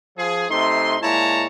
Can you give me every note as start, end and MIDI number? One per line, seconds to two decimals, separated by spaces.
0.17 0.45 53
0.17 0.45 68
0.50 0.96 48
0.50 0.96 57
0.50 0.96 63
0.50 0.96 84
1.02 1.46 46
1.02 1.46 56
1.02 1.46 64
1.02 1.46 73
1.02 1.46 81
1.02 1.46 82